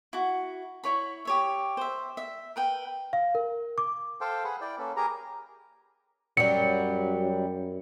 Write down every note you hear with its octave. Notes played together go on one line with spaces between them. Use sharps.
E4 F#4
E4 C#5 B5
G4 C#5 E5
C5 E5
E5
A#4 B4 G5
F5
A#4
D6
A4 C5 F5 G5
G#4 B4 F#5
E4 D5 G5
A#3 C#4 A4 B4
G4 G#4 A#4 A#5
F#2 F#3 G3 C#7